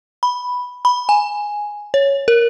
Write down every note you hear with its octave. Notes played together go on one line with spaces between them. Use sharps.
B5
B5
G#5
C#5
A#4